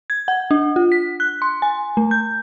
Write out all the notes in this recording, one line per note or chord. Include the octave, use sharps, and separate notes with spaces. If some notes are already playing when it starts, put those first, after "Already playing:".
G#6
F#5
D4
F4
B6
F#6
C6
G#5
A3
G6